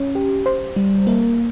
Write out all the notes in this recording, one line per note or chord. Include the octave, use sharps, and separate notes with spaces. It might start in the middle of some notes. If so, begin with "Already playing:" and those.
Already playing: C#4
G4
C5
G3
A#3